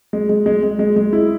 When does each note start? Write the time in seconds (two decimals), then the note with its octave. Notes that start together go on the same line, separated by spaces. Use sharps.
0.13 G#3
0.29 G#3
0.46 G#3
0.63 G#3
0.79 G#3
0.96 G#3
1.13 E4